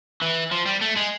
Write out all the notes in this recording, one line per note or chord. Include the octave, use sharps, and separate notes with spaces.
E3
F3
G3
A3
G#3